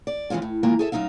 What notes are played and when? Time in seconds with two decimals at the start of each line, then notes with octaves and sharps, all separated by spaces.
0.07 D5
0.30 E3 F3 G#3 C#4 F4
0.42 A2
0.63 D#3 E3 G#3 A#3 F4
0.79 G#4 A4 E5
0.92 F#2 C#3 D#4 E5 F5